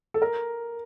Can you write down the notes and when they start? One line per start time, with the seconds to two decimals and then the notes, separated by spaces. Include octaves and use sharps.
0.14 A4
0.22 A#4